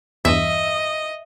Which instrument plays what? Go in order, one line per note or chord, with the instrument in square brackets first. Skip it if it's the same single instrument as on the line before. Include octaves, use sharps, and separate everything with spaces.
[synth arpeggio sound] E2 G2 [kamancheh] D#5 [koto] E5